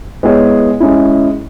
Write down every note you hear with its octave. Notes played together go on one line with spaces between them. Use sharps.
G#3 B3 E4 G#4 C#5
G#3 C#4 E4